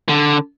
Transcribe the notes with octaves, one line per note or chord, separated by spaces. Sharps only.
D3